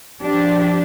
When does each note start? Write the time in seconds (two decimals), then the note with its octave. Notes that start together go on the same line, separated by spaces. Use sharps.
0.23 F3 D4 G4